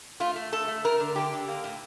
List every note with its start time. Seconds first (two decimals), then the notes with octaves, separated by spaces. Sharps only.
0.20 A3 F4
0.36 A3
0.52 A3 A4
0.68 A3
0.84 A3 A#4
1.00 D3
1.16 D3 G4
1.33 D3
1.48 A#3
1.64 A2